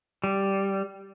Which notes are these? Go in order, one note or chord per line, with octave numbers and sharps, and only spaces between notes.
G3